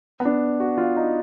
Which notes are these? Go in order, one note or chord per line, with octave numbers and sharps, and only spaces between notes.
B3
D4
F#4
F4
D#4